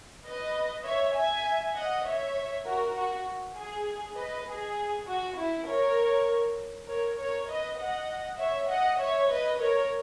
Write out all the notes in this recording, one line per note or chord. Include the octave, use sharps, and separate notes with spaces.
B4 D#5
C#5 E5
E5 G#5
D#5 F#5
C#5 E5
F#4 A#4
F#4
G#4
B4 D#5
G#4
F#4
E4
A#4 C#5
A#4 C#5
A#4 C#5
B4 D#5
D#5 F#5
C#5 E5
D#5 F#5
C#5 E5
B4 D#5
A#4 C#5